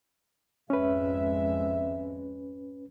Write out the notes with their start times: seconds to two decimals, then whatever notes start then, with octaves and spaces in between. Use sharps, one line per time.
0.70 G#1 F2 G#3 C#4 B4 E5